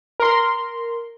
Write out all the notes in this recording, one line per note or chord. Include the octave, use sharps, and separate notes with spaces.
A#4 C6